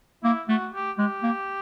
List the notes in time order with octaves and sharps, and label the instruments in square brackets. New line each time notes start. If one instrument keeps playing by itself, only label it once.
[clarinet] A#3 [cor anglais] E4
[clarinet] A3 [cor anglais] F#4
[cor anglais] G4
[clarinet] G#3 [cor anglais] G4
[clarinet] A#3